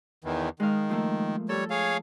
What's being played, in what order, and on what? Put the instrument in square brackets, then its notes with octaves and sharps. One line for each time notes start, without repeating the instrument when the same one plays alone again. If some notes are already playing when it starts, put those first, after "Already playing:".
[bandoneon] E2 D#3 E3
[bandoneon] D#3 [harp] G#3 F5
[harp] F3 A3 A#3
[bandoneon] G3 C#5 [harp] A4
[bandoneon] G#4 C#5 F5